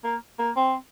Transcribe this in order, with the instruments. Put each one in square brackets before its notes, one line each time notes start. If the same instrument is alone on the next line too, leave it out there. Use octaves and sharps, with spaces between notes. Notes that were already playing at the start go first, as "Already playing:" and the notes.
[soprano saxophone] A#3
A#3
C4